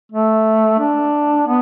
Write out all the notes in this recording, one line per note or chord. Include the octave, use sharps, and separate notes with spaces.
A3
D4
B3